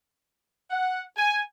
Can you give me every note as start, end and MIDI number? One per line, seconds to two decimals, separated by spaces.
0.70 1.01 78
1.17 1.39 80